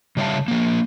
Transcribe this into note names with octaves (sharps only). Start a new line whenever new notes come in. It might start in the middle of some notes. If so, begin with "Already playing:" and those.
C#3 G3 C#5 E5 F5 A5
F3 A#3